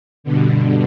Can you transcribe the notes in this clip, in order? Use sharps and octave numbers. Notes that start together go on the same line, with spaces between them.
G2 B2 D3